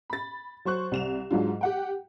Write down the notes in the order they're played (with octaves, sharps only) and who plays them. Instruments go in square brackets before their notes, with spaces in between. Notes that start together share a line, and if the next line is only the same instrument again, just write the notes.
[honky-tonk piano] B5 A6
F#3 C5 C#6 F#6
C2 E7 F7
G#2 F#3 D4 F4
G4 F#5 G5